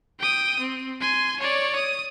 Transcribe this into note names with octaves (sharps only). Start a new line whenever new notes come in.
G5 D#6
C4
G#5 C6
C#5 D5
D#6